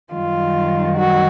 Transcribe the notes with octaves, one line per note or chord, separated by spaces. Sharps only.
F#2 D#3 G3 F4
F#4